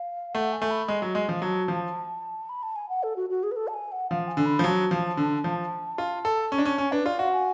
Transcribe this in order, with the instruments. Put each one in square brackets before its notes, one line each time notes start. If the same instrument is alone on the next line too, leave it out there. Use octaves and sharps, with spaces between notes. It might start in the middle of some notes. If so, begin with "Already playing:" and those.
Already playing: [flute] F5
[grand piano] A3 [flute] F#5
[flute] G#5
[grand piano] A3
[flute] B5
[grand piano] G#3
F#3
G#3
F3
[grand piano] F#3 [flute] A5
[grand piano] F3
[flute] B5
A5
G#5
F#5
A4
F#4
F#4
G#4
B4
A4
A5
G#5
F#5
[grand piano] F3 [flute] F5
[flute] G#5
[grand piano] D3
[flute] B5
[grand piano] F3
[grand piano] F#3 [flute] A5
[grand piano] F3
D3
F3
F4
A4
C#4
D4
C#4
[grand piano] C#4 [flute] G#5
[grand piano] D4 [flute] B4
[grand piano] F4 [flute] D5
[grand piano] F#4 [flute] F5
[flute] G#5